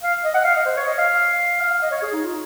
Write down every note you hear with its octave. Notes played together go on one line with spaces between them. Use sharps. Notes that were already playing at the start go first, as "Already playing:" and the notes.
F5
D#5
F#5
F5
D#5
C5
C#5
D#5
F5
F5
F5
D#5
C#5
G#4
D#4
F4